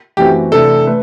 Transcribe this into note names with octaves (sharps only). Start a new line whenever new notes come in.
F#2 E3 A3 C4 F#4 G4
C3 E3 A3 D4 A4
A3 B4